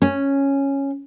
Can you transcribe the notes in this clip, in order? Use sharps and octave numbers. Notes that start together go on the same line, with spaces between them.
C#4